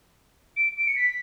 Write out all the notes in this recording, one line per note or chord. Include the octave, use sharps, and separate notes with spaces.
D7
D7
C#7
B6